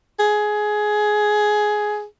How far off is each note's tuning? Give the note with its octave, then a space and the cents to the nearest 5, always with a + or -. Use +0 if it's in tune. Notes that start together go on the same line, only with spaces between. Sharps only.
G#4 +15